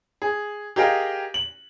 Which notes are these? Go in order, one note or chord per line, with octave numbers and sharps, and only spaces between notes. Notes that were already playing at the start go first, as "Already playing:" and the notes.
G#4
G4 G#4 A#4 D#5 F5 G5
F#7